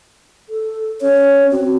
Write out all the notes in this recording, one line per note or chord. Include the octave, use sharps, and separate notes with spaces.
A4
C#4 C#5
C4 F#4